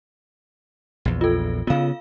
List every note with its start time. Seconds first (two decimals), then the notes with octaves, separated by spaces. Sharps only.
1.05 A#1 E2
1.21 F4 A4
1.67 C#3 B3 F4 F5